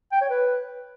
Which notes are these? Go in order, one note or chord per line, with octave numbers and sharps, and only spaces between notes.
G5
C#5
B4